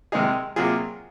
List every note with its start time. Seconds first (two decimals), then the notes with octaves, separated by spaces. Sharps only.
0.12 C3 D#3 G#3 D#4 G#4
0.56 C3 F#3 A#3 F4 G#4